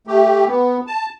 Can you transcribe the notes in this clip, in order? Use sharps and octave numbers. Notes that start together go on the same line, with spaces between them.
A3 G4
B3
A5